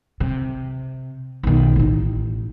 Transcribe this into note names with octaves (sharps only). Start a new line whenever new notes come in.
C3
B1 D#3
A1 D#4